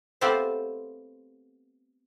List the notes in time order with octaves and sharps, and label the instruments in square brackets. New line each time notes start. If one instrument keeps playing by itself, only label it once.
[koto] A3 B3 C4 F4 G4 C5